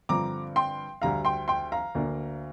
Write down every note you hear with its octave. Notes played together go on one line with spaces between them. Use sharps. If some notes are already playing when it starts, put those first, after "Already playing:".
G2 D3 F3 C4 A#5 D6
G5 C6
D2 D3 G3 F5 A#5
G5 C6
G5 C6
F5 A#5
D2 D3 A#3 D4